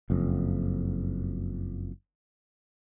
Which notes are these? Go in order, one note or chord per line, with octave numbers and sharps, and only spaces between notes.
F#1 F2